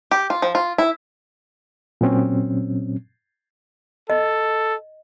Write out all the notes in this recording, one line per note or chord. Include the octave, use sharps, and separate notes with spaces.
G4
F4
F3
F4
E4
A#2 F#3 C4 C#4
A4 D#5